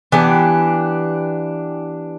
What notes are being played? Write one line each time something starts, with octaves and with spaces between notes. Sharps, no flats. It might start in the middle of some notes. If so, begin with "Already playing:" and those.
E3 B3 D4 G4